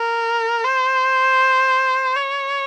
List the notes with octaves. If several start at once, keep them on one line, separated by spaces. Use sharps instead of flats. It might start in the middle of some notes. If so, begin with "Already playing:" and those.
Already playing: A#4
C5
C#5